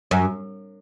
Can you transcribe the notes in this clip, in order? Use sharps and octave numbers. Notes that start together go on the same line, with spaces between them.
F#2